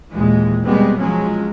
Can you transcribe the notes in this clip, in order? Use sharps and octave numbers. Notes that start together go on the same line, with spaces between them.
D#2 A#2 E3 G#3
B2 G3 G#3 B3 C4
F3 F#3 G#3 C#4